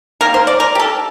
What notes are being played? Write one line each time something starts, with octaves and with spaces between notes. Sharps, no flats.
D#3 A#3 A#4
C5
D5
A#4
G4
A4